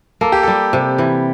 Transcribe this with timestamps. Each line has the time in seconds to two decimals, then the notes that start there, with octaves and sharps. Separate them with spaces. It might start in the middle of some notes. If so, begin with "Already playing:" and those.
0.21 A#3 A4
0.32 G4
0.43 G3 A4
0.73 C3
0.98 E3